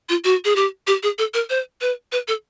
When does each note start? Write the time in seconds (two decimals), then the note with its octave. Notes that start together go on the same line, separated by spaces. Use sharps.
0.09 F4
0.24 F#4
0.45 G#4
0.56 G4
0.87 G4
1.03 G#4
1.18 A4
1.34 A#4
1.50 C5
1.81 B4
2.12 B4
2.28 A4